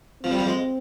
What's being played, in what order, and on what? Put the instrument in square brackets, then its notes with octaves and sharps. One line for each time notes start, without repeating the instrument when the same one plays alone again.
[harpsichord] F3 [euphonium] C4
[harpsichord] G3
F3
G#3